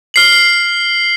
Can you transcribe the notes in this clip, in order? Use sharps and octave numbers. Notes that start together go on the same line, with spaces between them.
F6 C7 F#7